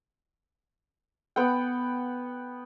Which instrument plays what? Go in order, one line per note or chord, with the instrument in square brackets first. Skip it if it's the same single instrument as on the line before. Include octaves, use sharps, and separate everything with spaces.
[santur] B3 F#5 G5